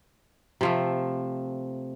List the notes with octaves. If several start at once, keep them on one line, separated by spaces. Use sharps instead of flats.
C3 F3 A3